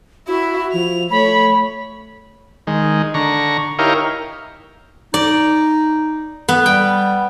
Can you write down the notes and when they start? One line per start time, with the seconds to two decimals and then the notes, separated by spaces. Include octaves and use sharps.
0.28 E4 F#4
0.73 F3 F7
1.11 A3 C#5 B5
2.67 D#3 G#3
3.14 D3 A#5 C#6
3.79 D#4 E4 G4 A#4 C#5 F5
5.14 D#4 D5
6.49 B3
6.66 G3 G5